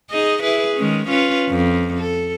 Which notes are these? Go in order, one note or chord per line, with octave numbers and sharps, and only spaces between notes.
D#4 G#4 D#5
E4 G#4 B4
D#3 G#3 C#4
C#4 F4 B4
F2
A4